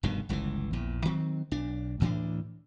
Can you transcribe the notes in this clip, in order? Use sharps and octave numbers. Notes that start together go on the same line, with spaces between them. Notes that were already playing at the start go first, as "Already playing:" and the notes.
F1 G2 B2 D#3
G1 C#2 C3 E3
A#1 E2 A#2
D#3 F#3 C4
B1 D4
D2 A2 E3 D4